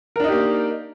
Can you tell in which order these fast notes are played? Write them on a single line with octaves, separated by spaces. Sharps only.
A#4 D4 D#4 G4 A#3